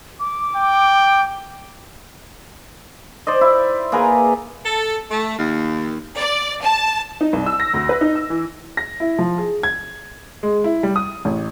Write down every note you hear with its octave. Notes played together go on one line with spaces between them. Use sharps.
D6
G5
C5 D5 D#5
E4
A#3 G#4 B4 A#5
A4
A3
D#2
D5
A5
D#4
C2
E6
A#6
D2
B4
D#4
E6
E3
A#6
E4
F3
G#4
G#6
G#3
E4
G3
D#6
A1